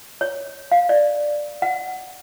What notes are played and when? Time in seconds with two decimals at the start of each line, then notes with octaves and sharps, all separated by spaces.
0.21 C#5
0.72 F5
0.89 D5
1.62 F#5